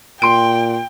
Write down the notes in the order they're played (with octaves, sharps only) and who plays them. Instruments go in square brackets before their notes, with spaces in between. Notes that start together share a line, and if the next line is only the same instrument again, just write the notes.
[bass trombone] A#2 [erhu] G5 [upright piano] C6 D7